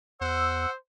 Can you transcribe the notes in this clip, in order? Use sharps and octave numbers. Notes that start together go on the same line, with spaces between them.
E2 C5 F#5 E6